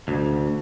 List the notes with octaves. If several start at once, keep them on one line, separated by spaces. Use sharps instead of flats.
D2